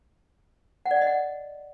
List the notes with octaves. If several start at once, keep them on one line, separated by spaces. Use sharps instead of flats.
F#5
D5
F#5
D#5
F#5